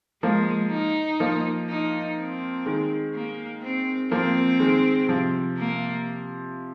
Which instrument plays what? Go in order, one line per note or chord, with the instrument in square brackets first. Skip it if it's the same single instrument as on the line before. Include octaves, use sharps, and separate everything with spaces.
[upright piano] F3 A#3 [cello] G#3
[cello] D#4
[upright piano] F3 A#3
[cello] D#4
C4
[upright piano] D#3 G#3
[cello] A#3
C4
[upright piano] F3 A#3 [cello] C4
[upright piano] D#3 G#3
C3 F3
[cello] A#3